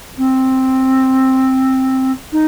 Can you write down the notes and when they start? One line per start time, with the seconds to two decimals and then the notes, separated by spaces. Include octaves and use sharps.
0.18 C4
2.33 D#4